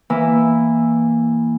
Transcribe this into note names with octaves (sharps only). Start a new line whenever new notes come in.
E3 A#3 E4